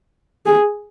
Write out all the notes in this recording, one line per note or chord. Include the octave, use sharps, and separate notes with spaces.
G#4